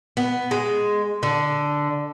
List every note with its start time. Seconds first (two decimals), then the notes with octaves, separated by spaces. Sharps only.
0.17 B3
0.51 G#3
1.23 D3